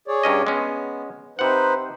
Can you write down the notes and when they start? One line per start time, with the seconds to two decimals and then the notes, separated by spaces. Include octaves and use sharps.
0.08 G#4 C#5 D5
0.23 G2 C#4 D#5
0.47 G#3 B3 C#4
1.39 C3 D#4 B4 C5 F#5